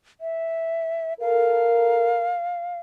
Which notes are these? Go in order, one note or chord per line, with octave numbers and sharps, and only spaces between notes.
E5
A4 A#4 F5